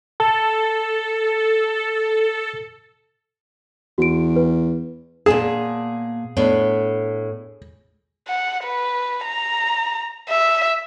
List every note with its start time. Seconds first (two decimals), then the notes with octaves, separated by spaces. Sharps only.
0.20 A4 A5
3.98 E2 F#4 D7
4.36 B4
5.26 A#2 B3 G#4 A5
6.37 A2 B3 D4
8.28 F#5
8.64 B4
9.25 A#5
10.29 E5